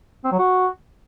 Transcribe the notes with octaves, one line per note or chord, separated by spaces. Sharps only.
C4
F#3
F#4